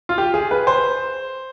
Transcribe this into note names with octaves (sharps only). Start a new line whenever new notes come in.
F4
G4
G#4
B4
C5